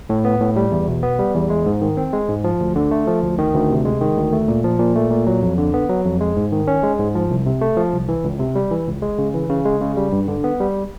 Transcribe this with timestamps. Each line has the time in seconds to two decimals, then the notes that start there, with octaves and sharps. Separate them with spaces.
0.09 A2
0.25 B3
0.40 A2
0.56 G3
0.72 E2
0.88 B2
1.03 B3
1.19 G3
1.35 E2
1.50 G#3
1.66 G#2
1.81 D#3
1.97 C4
2.13 G#3
2.28 G#2
2.44 F3
2.60 D2
2.76 D3
2.91 A3
3.07 F3
3.23 D2
3.38 D#3
3.54 D2
3.70 C3
3.85 G#3
4.01 D#3
4.16 D2
4.32 A3
4.48 A#2
4.64 F3
4.79 A#2
4.96 A3
5.11 A#2
5.27 F#3
5.42 F2
5.58 D3
5.74 B3
5.89 F#3
6.05 F2
6.21 G#3
6.36 G#2
6.52 D#3
6.68 C#4
6.83 G#3
6.99 G#2
7.15 F3
7.30 C2
7.46 C3
7.61 A3
7.77 F3
7.93 C2
8.08 E3
8.24 C#2
8.40 C3
8.55 G3
8.71 E3
8.87 C#2
9.02 G#3
9.18 C#3
9.34 E3
9.50 C#3
9.65 G#3
9.81 C#3
9.97 G3
10.12 G2
10.28 D3
10.44 B3
10.60 G3